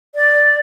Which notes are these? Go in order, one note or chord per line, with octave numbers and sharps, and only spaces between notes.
D5